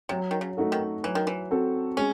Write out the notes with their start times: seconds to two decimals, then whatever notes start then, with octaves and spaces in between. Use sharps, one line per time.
0.09 C3 F#3
0.31 D#3
0.41 C#3
0.57 A3 D#4 F#4 A4
0.72 D#3
1.03 E3 F#3
1.15 D#3
1.27 E3
1.51 C4 F#4 A4
1.97 G#3 C#4